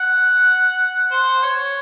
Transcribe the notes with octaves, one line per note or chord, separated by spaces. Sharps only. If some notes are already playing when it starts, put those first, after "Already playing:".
Already playing: F#5
C5
C#5